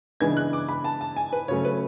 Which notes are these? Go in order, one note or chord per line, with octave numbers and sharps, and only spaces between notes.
C#3 E3 G#3 B3 D4 G#6
F#6
D6
B5
A5
A5
G#5
B4
C#3 F#3 A3 C#4 C#5
B4